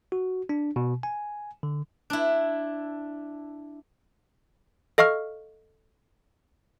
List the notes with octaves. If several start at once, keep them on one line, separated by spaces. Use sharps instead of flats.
F#4
D4
B2
G#5
D3
D4 E4
A4 D#5 F5 C#6 F6